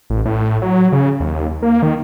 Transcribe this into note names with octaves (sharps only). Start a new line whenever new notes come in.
A1
A2
F#3
C#3
D#2
A#3
D#3